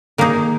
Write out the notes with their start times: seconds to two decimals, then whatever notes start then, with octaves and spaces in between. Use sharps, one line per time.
0.18 D#3 A#3 D#4 G#4